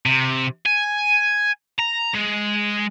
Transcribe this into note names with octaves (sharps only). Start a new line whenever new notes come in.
C3
G#5
A#5
G#3